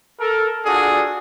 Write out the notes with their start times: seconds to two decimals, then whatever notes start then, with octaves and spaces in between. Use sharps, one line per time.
0.20 A4 A#4
0.65 D4 F4 F#4 G#4 A4 D5